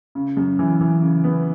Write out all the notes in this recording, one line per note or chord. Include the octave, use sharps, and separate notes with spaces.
C#3
F#2
E3
E3
C#3
B3